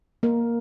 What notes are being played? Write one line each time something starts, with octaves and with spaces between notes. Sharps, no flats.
A#3 A#4